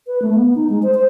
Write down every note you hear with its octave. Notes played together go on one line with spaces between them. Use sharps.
B4
A3
B3
D#4
G#3
C5
C5